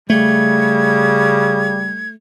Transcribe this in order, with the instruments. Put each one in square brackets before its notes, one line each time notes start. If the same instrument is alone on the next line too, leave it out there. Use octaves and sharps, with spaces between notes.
[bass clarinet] C#3 [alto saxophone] G3 [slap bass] A3 [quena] G#6